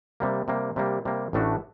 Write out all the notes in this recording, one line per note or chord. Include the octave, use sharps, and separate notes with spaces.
C3 G3 A#3
C3 G3 A#3
C3 G3 A#3
C3 G3 A#3
A1 A2 A3 D4 F#4